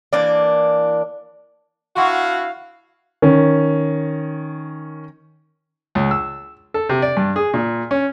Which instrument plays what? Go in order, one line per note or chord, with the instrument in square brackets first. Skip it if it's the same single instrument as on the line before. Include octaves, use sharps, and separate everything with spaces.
[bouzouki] E3 A#3 D4 D5
[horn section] D4 E4 F#4 [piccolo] F5 [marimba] F#5 C6 C#6
[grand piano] D#3 C#4
[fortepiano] C#2
E6
A4
C3
D5
G2
G#4
A#2
C#4